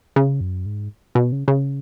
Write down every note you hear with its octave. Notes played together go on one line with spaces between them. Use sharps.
C#3
F#2
G#2
B2
C#3
C#3